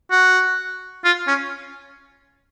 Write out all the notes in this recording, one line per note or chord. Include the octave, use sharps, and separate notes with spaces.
F#4
F4
C#4